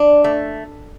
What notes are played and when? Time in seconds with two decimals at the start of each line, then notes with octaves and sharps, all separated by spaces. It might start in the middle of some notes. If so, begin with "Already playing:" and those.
Already playing: D4
0.24 A3